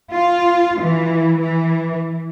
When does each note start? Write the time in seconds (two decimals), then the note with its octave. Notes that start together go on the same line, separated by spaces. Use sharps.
0.12 F4
0.81 E3
1.41 E3